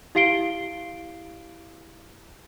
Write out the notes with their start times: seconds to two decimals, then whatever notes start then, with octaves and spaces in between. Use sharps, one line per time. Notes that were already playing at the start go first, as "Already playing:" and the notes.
0.15 E4 G4 F5 C7 D7 G7